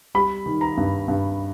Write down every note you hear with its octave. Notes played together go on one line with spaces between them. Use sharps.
G3 B5
D#3
A#5
G2
G2